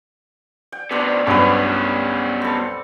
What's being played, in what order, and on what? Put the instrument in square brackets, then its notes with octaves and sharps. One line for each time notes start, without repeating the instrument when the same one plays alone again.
[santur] G5
[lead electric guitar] C3 B3 [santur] C4 D4 A5
[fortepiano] B1 G2 [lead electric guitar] B2 C#4 [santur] A4 B4
[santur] C4 A4